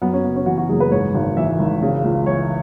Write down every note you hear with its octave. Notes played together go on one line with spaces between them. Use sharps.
F#2 B3
C#4
F#1 B3
C#4
E3 F#4
F#4
F#1 G#4
B4
G#2 C#5
G#1
E3 E5
G#1
C#3
C#2
E3 C#5